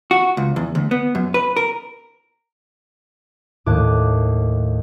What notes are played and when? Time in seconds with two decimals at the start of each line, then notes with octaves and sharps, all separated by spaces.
0.11 F#4
0.37 C#2
0.56 E2
0.75 D2
0.91 B3
1.15 F#2
1.34 B4
1.57 A#4
3.66 D#2 A2 D6 F#6 G#6 D#7